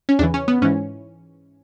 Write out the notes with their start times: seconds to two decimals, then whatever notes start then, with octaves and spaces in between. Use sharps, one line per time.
0.09 C#4
0.19 E2 C#3 E3 D4
0.34 C#4
0.48 B3
0.62 G#2 E3 C#4